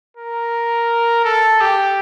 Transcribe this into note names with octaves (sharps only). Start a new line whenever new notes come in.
A#4
A4
G4